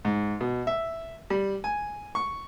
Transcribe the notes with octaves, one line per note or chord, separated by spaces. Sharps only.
G#2
B2
E5
G3
G#5
C#6